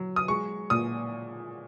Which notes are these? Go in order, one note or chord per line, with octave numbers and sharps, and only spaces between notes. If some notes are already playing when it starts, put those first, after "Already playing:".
Already playing: F#3
D#6
G#3 C#6
A#2 D#6